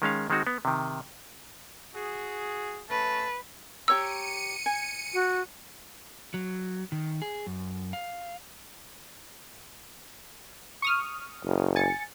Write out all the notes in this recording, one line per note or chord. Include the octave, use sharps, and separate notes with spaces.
D#3 G#3 C#4 F5
D#3 G#3 C4 D#4 F#4
B3
C3 D#3
F#4 G#4
A3 C#4 B4 A5
G4 C#5 A#5 E6 C#7 D#7
G#5
F#4
F#3
D#3
G#4
F#2
F5
C#6 D#6 F6
F#1
G#5 A6 C#7